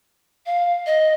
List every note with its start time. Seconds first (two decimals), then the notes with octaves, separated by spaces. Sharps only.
0.46 F5
0.86 D#5